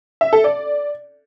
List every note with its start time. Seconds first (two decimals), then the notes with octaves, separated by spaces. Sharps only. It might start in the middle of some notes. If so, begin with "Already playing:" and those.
0.21 E5
0.33 A4
0.44 D5